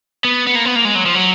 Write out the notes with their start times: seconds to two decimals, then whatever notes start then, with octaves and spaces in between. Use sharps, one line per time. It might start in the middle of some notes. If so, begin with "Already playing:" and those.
0.24 B3
0.47 B3
0.55 A#3
0.66 B3
0.76 A#3
0.85 G#3
0.95 F#3
1.06 F3
1.15 F#3